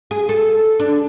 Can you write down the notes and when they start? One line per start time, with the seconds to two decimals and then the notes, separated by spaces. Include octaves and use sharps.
0.11 G#4
0.29 A4
0.80 D4